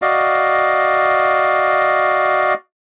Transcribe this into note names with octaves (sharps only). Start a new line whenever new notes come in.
F#4 D5 D#5 F5